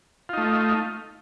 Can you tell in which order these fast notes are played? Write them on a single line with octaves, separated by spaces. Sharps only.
F4 D#4 A3